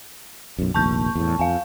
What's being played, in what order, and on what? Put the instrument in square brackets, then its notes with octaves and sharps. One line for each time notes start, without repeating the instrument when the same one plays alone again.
[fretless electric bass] B1 F#2
[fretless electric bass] F1 A#1 D#2 [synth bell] A5 C#6 G6
[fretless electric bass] E2 A2
[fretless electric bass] F2 [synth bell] F5 G#5